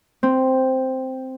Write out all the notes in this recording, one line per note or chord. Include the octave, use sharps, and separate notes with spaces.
C4